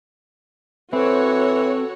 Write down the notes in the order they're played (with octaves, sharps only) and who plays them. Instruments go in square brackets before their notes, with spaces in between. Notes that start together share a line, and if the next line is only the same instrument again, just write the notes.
[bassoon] E3 [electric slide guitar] C4 [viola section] F#4 C#5 [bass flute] A4